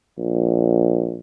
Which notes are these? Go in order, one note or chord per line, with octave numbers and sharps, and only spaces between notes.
A#1